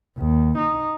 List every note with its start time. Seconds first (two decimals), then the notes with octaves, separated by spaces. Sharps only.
0.18 D#2
0.58 D#4